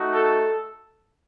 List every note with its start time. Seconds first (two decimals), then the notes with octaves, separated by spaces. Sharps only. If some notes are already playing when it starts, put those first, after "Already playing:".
Already playing: A3 D#4 F#4
0.13 A4